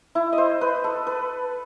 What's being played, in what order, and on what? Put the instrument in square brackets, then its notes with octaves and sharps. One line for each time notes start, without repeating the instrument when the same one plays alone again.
[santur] E4
D#5
C5
B4
A4
B4